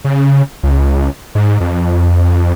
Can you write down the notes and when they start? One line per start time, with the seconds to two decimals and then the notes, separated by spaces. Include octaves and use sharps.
0.04 C#3
0.63 C#2
1.35 G#2
1.61 F2